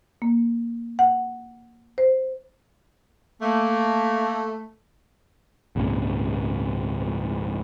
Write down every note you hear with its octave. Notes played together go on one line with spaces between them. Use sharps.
A#3
F#5
C5
A3 A#3
G#1 C#2 A#2 C#3